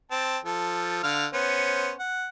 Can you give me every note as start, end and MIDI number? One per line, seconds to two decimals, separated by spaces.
0.11 0.37 60
0.11 0.37 81
0.44 1.01 53
0.44 1.01 69
1.03 1.26 50
1.03 1.26 77
1.03 1.26 89
1.33 1.93 59
1.33 1.93 61
1.33 1.93 72
1.99 2.29 78